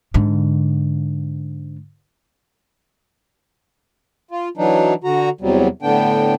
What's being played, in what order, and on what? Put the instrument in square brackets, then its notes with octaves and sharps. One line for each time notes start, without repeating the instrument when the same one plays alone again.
[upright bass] G#2 D3
[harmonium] F4
E3 F#3 D4 D#4
D3 F#4 A#5
E2 C3 F#3 G3
A2 D3 B3 D4 G5